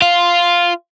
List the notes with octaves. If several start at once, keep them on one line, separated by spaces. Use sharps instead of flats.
F4